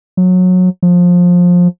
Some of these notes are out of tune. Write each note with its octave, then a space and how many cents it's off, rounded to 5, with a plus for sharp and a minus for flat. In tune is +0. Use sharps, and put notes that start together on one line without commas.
F#3 -20
F3 +20